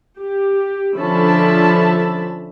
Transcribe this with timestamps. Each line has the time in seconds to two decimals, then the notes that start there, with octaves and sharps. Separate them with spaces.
0.18 G4
0.95 D3 F3 C#4 E5 A5 B5